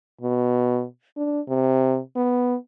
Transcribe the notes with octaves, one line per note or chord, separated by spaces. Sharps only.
B2
D4
C3
B3